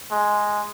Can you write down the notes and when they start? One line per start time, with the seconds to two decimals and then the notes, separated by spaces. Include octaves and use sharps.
0.11 G#3